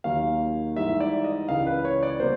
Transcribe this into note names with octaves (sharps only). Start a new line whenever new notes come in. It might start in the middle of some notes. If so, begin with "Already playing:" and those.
D#2 D#3 F#3 F5
G#2 E3 G3 E5
D5
D#5
C#2 C#3 E3 F5
B4
C#5
D5
B2 G3 A#3 C5